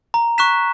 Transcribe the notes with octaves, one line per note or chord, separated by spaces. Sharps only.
A#5
C#6 F#6 B6 E7